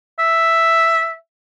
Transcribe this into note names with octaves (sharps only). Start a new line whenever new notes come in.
E5